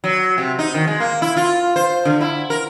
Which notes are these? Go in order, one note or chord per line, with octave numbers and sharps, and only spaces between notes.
F#3
C3
D#4
D#3
G#3
A#3
E4
F4
C5
D3
E4
A#4